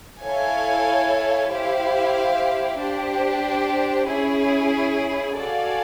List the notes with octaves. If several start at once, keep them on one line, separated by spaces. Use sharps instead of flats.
E4 A4 C#5 F5 G#5
E4 G4 C5 F5
D4 G4 C5
C#4 E4 G#4
F#4 A4 D5 F5 G#5